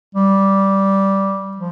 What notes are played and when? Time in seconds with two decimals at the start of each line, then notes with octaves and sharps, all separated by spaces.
0.15 G3
1.57 F3